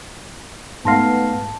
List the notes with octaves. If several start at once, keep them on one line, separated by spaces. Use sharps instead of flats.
G#2 A3 B3 F5 A5 C6 A#6